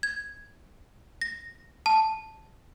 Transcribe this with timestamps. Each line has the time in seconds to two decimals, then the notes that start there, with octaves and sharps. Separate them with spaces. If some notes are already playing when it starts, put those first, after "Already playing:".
0.03 G#6
1.22 A#6
1.86 A5